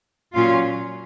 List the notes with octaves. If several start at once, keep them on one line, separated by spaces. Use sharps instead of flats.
A#2 F#3 C#4 F4